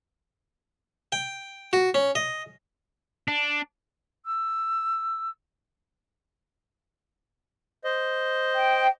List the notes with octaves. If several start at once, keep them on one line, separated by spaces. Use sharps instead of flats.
G5
F#4
C#4
D#5
D4
E6
C5 D#5
G5